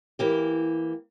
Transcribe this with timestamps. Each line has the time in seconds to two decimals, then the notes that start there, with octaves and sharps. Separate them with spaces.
0.19 E3 A#3 G4